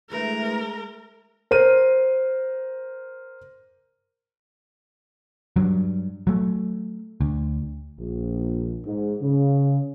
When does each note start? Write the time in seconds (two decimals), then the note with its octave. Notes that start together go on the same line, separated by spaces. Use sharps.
0.10 D2 E3 G#3 A3 A#4
1.51 A#4 C5 D#7
5.56 G2 F#3
6.27 F#3 A3
7.21 D2
7.99 A#1
8.85 G#2
9.21 C#3